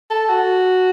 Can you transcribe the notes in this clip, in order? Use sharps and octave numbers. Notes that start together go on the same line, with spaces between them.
A4
F#4